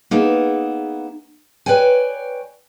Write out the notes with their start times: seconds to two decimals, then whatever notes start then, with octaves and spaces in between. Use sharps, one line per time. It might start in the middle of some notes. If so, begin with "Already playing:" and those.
0.11 A#3 B3 D#4 G#4 E5
1.66 B4 C#5 D5 G5 G#5